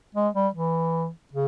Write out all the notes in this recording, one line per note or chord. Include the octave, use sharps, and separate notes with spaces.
G#3
G3
E3
C#3